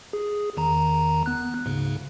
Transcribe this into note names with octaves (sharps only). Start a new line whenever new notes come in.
G#4
E2 D#3 A#5
B3 F#6
D2 G#2 C#3